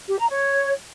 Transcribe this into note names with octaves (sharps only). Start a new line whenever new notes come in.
G4
A#5
C#5